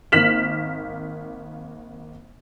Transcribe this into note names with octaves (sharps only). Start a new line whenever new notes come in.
G#1 A#3 F6 B6 E7 F#7